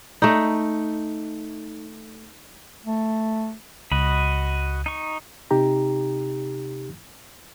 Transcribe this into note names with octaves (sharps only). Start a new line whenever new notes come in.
A3 D#4
A3
C#2 F#4 D#5 B5
D#4 C#6
C3 D#4 G4 A#5